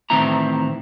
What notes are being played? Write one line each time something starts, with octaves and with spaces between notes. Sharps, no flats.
A2 D#3 E3 C4 E4 A#5